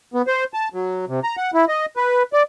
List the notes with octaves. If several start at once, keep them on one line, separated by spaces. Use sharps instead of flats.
B3
C5
A5
F#3
C3
A#5
F#5
E4
D#5
B4
D5